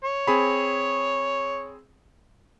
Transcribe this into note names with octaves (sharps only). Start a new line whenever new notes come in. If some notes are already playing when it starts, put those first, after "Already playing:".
C#5
C4 G#4 B5